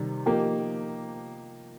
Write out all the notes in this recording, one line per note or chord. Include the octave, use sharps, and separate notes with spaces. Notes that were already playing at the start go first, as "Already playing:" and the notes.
Already playing: C3 D#3 G3
F3 A#3 D#4 G4